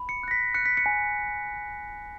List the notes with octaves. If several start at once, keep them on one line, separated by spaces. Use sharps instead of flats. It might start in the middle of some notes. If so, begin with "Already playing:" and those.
Already playing: B5
C#7
F#6 A#6
B6
F#6 C#7
B6
C#7
G#5